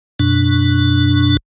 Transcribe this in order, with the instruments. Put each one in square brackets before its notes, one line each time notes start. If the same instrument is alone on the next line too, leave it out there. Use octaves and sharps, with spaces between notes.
[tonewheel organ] F#2 B2 D4